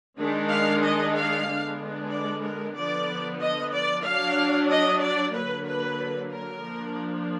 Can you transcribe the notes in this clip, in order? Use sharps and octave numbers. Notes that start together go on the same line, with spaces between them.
D#3 G#3 D4
F5
D#5
F5
D3 G#3 B3 D4
D5
A#4
D3 F3 B3 D5
D#5
D5
F#3 D4 F5
D#5
D5
D3 F#3 A#3 B4
B4
A#4
F3 A#3 D4